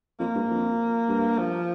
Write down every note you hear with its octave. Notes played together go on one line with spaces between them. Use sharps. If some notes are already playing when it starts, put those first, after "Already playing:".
F2 A#3
G2
F2
G2
F3